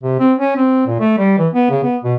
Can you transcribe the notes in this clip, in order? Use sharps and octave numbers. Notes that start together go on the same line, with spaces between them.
C3
C4
C#4
C4
A#2
A3
G3
E3
B3
C#3
B3
B2